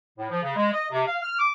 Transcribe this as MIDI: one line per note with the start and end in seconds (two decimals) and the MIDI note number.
0.18 0.27 45
0.30 0.39 53
0.42 0.55 49
0.56 0.70 56
0.72 0.84 75
0.91 1.03 48
1.06 1.16 77
1.21 1.36 89
1.39 1.52 86